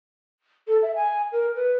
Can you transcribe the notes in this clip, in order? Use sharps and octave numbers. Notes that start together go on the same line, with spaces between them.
A4
E5
G#5
A#4
B4